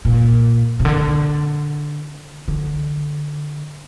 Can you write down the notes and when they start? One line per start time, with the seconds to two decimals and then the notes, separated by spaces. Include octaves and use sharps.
0.05 A#2
0.80 C3
0.85 D3
2.48 D3